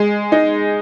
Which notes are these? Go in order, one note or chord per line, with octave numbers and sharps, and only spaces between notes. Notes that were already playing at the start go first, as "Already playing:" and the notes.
Already playing: G#3
D#4